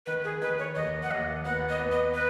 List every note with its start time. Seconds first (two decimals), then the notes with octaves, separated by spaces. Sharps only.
0.06 D#3 B4
0.24 G#4
0.41 D#3 B4
0.59 C#5
0.76 D#2 D#5
1.03 F#5
1.11 D#2 D#5
1.45 B3 F#5
1.69 D#5
1.80 B3
1.92 D#5
2.14 B4